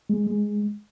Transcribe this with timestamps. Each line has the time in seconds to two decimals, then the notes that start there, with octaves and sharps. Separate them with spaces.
0.10 G#3
0.27 G#3